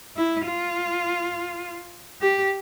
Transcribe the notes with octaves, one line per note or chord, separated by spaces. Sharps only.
E4
F4
G4